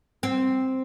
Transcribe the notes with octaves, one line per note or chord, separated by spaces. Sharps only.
C4